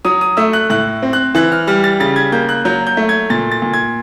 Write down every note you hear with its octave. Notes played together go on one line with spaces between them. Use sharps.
F#3 D#6
D#6
A3 E6
F#6
A2 F#6
C4
F#6
E3 F#6
F6
G3 F6
A6
C#3 A6
G#6
A#3 G6
F#6
F#3 G6
G6
A3
G#6
A#2 A6
A6
A#2
G#6